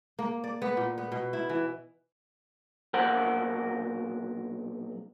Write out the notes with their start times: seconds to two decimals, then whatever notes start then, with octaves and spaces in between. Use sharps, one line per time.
0.19 A#3
0.44 D5
0.62 B3
0.77 A#2
0.98 B3
1.12 B2
1.33 E4
1.49 E3
2.94 B1 A#2 A#4 C5 F#5